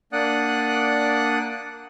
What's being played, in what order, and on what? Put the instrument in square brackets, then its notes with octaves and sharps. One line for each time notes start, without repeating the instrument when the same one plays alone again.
[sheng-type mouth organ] A#3 D4 D5 F#5 D#6 F#6